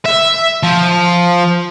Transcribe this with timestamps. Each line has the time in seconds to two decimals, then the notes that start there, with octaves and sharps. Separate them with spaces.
0.05 E5
0.63 F3